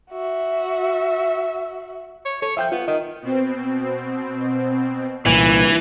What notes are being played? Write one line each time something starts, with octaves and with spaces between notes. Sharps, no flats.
F#4 E5
C#5
A4 C#5
F3 E5 G5 G6
B3 F4
D#3 D#5
B2 C4
C2 A#2 E3